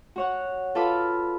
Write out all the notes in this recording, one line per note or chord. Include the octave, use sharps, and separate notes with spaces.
F#4 C#5 F#5
F4 A4 B4 F5 B5 D6